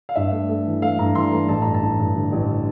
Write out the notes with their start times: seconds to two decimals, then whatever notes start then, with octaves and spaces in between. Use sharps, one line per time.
0.09 F5
0.16 G2 E5
0.32 A3
0.49 A3
0.66 E3
0.82 A3 F5
0.99 G2 A#5
1.15 E3 C6
1.32 A3 A#5
1.49 A1 A5
1.62 G2 A#5
1.74 A5
1.83 A1
1.99 G2
2.16 D3
2.32 A1
2.48 D3